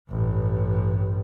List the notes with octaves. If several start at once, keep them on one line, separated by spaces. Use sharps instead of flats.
A1 G2